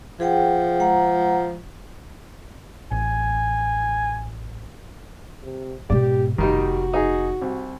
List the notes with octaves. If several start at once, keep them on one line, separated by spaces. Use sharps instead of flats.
F3 G#4 F#5 G5
G#3 F#5 A#5
A1 G#5
C3
G#2 B2 G4 D5
F1 D#3 G3 D#4 F#4
D#4 G#4
C2